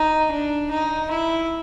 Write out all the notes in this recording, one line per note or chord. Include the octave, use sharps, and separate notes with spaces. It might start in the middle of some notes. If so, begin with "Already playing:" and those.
Already playing: D#4
D4
D#4
E4